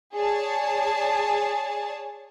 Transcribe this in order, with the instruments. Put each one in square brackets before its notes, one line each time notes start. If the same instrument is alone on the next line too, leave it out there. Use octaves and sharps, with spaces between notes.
[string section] G#4 C#5 D5 A5